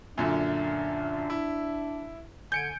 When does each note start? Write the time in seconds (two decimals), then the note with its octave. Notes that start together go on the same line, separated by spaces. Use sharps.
0.18 F#2 A#2 D3 D4 E5
1.30 E4
2.52 D3 G#5 G6 C#7 D7